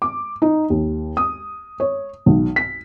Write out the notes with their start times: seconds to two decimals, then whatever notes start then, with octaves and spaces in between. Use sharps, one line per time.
0.02 D6
0.42 D#4
0.70 D#2
1.17 D#6
1.80 C#5
2.26 B1
2.56 B6